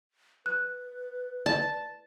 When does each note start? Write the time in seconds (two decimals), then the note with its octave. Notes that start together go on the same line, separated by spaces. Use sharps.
0.46 B4 F#6
1.46 D5 A5